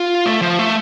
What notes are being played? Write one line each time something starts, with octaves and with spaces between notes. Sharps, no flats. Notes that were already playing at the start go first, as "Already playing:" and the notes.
Already playing: F4
A3
F3
A3